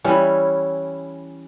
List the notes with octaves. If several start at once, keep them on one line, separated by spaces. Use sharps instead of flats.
E3 G3 C#4 E4